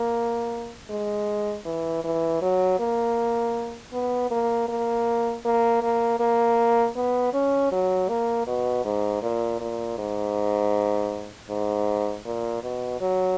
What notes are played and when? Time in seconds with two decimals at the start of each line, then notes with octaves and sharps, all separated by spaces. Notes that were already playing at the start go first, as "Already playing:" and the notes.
Already playing: A#3
0.90 G#3
1.65 E3
2.04 E3
2.41 F#3
2.79 A#3
3.93 B3
4.30 A#3
4.68 A#3
5.45 A#3
5.82 A#3
6.20 A#3
6.95 B3
7.33 C#4
7.72 F#3
8.09 A#3
8.47 B2
8.85 G#2
9.22 A#2
9.60 A#2
9.98 G#2
11.49 G#2
12.25 A#2
12.63 B2
13.01 F#3